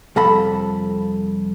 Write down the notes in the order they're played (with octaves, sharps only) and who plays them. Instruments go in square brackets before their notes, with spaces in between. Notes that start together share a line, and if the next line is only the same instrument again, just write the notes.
[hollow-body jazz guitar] C2 F2 A4 B5